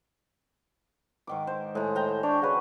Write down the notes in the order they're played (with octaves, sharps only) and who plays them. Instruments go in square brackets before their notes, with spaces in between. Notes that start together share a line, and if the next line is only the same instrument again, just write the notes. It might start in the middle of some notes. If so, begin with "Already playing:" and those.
[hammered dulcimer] G#2 D#3 D6
C5
[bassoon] A2 [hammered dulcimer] G#3 A#5
[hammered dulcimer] C5 G5 A#5
[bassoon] D4 [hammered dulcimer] C#5
[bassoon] C#3 [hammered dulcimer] F#4 B4